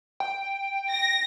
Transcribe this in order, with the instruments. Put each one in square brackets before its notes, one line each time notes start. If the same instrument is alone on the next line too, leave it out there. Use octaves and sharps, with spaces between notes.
[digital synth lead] G5
[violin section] A#6